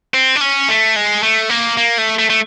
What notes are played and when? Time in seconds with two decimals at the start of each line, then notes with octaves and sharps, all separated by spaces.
0.14 C4
0.36 D4
0.41 C#4
0.69 A3
0.96 G#3
1.23 A3
1.50 A#3
1.77 A#3
1.98 A3
2.19 A3
2.30 A3